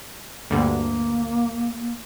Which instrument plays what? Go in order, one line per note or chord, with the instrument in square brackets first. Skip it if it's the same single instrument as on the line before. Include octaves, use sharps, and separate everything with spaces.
[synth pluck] D2 G2 D3 [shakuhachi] A#3